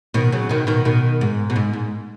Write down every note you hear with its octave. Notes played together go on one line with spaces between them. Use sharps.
B2 D#3
C#3 F#3
B2 D#3
B2 D#3
B2 D#3
G#2
B2
G#2
G#2